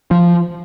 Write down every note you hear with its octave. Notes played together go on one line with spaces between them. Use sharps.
F3